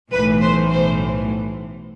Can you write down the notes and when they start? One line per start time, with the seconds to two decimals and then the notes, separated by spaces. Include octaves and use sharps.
0.12 B1 A2 E3 B4
0.41 C5
0.70 C5